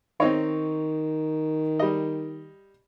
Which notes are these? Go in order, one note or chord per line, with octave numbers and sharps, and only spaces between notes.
D#3 C4 D#4 C#5
G3 D#5